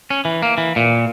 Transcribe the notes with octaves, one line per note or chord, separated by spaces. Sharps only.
C#4
E3
A#3
E3
A#2